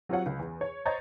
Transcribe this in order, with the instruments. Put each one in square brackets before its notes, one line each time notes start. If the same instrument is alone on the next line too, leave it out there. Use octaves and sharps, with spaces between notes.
[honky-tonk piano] F#3 C4 F4 G4 C#5 F#5
C#2
E2
C#5
C5 C#5 D#5 A#5 G6 A6